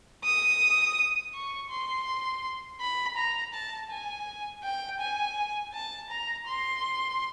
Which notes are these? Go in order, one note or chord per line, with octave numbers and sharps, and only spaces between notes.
D#6
C#6
C6
B5
A#5
A5
G#5
G5
G#5
A5
A#5
C6